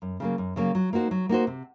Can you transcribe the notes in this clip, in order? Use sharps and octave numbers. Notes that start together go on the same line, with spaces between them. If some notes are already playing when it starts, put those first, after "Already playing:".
F#2
C#3 F#3 A#3
F#2
C#3 F#3 A#3
F#3
A#3 D#4 F#4 C5
F#3
A#3 D#4 F#4 C5
C3